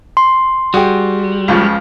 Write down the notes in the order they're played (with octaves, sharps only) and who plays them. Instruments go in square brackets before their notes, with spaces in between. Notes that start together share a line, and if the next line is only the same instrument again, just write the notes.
[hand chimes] C6
[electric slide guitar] G3 [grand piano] F#4 G#4 G5
[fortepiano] C#2 C#3 F3